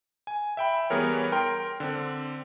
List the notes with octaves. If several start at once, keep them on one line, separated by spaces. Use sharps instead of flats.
G#5
E5 G5 B5
E3 G3 B3 G#4 A#4 C#5
A#4 G5 C6
D3 C4